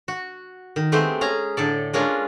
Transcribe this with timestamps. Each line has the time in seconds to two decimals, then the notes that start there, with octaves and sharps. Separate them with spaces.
0.08 F#4
0.76 D#3
0.92 G#3 A3 B3 C4 G4 C5
1.21 C#4 G#4 A#5
1.57 A2 D3 A4 D5
1.93 G#3 A#3 C#4 D4 F4 A#4